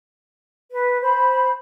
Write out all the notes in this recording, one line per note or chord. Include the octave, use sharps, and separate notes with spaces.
B4
C5 B5